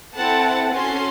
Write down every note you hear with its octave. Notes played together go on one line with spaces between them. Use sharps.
C4 E4 A4 F#5 A5
C#4 F#4 A4 G#5 C6